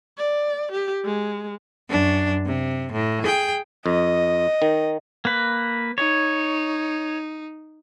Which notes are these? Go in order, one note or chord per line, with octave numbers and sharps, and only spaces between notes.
D5
G4
G#3
F#2 D4
C3
A2
G#4 G5
F2 D#5
D#3
A#3 B4
D#4 C#5